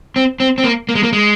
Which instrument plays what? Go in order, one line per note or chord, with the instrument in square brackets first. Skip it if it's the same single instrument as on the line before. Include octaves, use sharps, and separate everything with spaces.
[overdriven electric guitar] C4
C4
C4
A#3
A#3
G#3
A#3
G#3